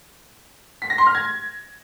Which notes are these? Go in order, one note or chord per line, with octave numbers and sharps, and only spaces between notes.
B6
A#6
C6
F6
G#6